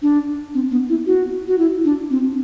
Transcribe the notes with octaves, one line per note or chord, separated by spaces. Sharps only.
D4
C4
B3
E4
F#4
F#4
E4
D4
C4